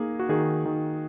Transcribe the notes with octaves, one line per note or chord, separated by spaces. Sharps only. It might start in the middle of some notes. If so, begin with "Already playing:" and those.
Already playing: A#3 D#4 G#4
F#4
D#3 G#4
D#3